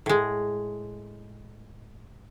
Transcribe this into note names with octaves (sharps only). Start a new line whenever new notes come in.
A2 G#3